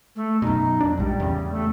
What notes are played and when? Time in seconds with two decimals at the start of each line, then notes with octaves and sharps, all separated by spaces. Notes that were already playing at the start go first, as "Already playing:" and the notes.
0.15 A3
0.42 F#2 B2 D#4
0.81 F2 D4
0.97 A#1 G#2 G3
1.20 E2 C#3
1.51 A3